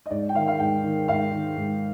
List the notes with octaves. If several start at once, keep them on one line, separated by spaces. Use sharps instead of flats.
D#5
G#2 D5
G5
D#3 F5
F5
G#2 G5
D#3
G#2 F5
D#3
G#2